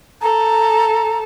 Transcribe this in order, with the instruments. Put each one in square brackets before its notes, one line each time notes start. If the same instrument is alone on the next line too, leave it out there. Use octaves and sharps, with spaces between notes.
[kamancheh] A4 [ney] A#5